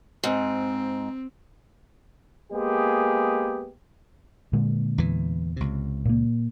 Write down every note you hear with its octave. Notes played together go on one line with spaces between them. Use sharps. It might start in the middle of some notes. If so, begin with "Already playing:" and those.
G#2 C4
G#3 A#3 B3 G4 G#4
A#2 D3 G#3
E2 E3
C#2 C3
A#2 A#3